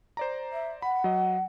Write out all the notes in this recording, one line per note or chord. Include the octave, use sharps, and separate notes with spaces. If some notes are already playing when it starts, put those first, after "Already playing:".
C5 D5 A#5
E5
F#5 B5
F#3 D#5